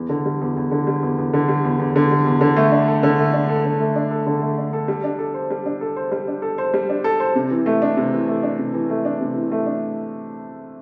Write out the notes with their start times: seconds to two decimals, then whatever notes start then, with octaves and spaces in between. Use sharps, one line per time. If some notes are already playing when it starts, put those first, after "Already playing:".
Already playing: E2
0.09 D3
0.25 G3
0.41 E2
0.57 E2
0.71 D3
0.87 G3
1.03 E2
1.18 E2
1.34 D3
1.48 G3
1.64 E2
1.79 E2
1.96 D3
2.11 G3
2.26 E2
2.41 D3
2.56 A3
2.72 D4
2.88 A4
3.03 D3
3.19 A3
3.33 D4
3.49 A4
3.65 D3
3.80 A3
3.96 D4
4.11 A4
4.27 D3
4.41 A3
4.58 D4
4.73 A4
4.88 G3
5.04 D4
5.19 A4
5.34 C5
5.50 G3
5.66 D4
5.81 A4
5.96 C5
6.12 G3
6.28 D4
6.42 A4
6.58 C5
6.74 G3
6.90 D4
7.04 A4
7.20 C5
7.35 C3
7.51 E3
7.66 A3
7.82 D4
7.97 C3
8.13 E3
8.28 A3
8.43 D4
8.59 C3
8.74 E3
8.90 A3
9.05 D4
9.21 C3
9.36 E3
9.52 A3
9.66 D4